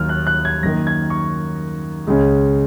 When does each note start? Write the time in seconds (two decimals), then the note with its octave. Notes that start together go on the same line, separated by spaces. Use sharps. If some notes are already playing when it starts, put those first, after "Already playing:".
Already playing: D#2 D#3 F#3 F6
0.09 F#6
0.27 F#6
0.45 G#6
0.63 F#2 D#3 A#3 A#6
0.87 G#6
1.10 C#6
2.07 C#2 C#3 G#3 C#4